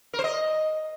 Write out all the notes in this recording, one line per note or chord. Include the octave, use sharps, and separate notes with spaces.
A#4
C5
D#5